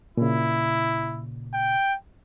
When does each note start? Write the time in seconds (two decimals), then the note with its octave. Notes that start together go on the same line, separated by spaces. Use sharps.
0.17 A#2 C#3 E4
1.54 G5